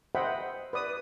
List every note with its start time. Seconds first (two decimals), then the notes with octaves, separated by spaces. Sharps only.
0.15 C5 D#5 E5 F#5 G5 B5
0.73 B4 D5 D#6